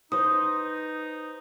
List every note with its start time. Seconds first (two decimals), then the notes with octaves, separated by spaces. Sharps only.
0.12 D#4 B4 C5 D#6